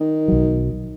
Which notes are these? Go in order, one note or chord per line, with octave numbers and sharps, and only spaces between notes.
D#3
B1 F#3